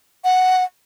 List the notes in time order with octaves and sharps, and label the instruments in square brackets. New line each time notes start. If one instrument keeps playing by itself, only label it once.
[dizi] F#5